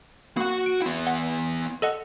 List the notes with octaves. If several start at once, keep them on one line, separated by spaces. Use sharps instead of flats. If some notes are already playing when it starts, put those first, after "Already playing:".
A#3 F#4 F#5
D7
B3 E4
F#5
A4 D#5 F#5